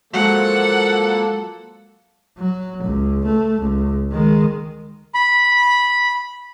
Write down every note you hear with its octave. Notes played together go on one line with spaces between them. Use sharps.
F3 F#3 G#3 A#3 A4 F#5
F#3
C#2
A3
C#2
D#3 G#3
B5